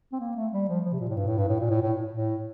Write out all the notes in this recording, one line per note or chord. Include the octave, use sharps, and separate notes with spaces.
C4
A#3
A3
G3
F3
F3
C3
A#2
A2
G2
A2
G2
A2
A#2
A2
A2
A2